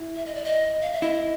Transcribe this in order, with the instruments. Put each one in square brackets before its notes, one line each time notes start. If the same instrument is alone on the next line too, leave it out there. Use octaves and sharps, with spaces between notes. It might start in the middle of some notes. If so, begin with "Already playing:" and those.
Already playing: [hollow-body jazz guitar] E4
[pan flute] E5
D#5
D5
D#5
F5
E5
[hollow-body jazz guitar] E4 [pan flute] D#5